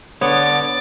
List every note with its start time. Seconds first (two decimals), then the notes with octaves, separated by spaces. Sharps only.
0.21 D3 B3 C#5 D6 A6